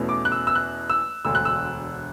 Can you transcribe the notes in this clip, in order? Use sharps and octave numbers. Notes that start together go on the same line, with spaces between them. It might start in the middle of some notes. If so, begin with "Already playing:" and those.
Already playing: E2 B2 A3 C#4
D6
F#6
E6
E6
F#6
E6
E1 D2 D3 E6
F#6
E6